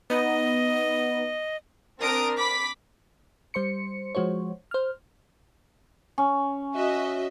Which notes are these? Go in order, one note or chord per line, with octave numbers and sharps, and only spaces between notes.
B3 D#4 D#5
C4 D4 A#4 A#5 D#6 D7
B5 D6 B6
G3 C5 C6 C#7
F3 G#3 F#4 C5 C#5
C5 F6
C#4
F#4 D#5 E5